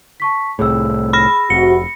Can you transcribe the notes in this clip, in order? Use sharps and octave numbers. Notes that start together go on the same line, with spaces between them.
A5 C#6 B6
C2 A2 G#4 E6
B5 A#6
F1 C3 F#4 C#7